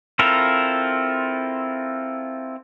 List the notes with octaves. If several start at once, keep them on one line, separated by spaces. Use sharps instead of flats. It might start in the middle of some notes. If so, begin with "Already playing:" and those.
C4 E4 F4 A4 A#4